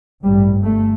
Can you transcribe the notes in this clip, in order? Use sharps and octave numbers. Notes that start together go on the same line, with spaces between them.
A1 G2 G3
G1 A3